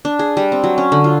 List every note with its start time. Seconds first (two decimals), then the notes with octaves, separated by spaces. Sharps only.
0.05 D4
0.19 G#4
0.37 G3
0.52 C4
0.64 F#3
0.78 C#4
0.92 D3
1.04 F4